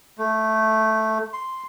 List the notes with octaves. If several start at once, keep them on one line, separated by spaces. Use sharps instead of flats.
A3
C6